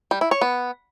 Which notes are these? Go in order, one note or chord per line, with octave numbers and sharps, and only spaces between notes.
G3
E4
C#5
B3